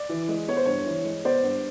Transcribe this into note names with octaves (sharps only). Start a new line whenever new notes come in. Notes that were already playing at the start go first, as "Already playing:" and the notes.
Already playing: D5
E3
G#3
B3 C#5
C5
G2 C#5
E3
G#3
B3 C5 D5
G2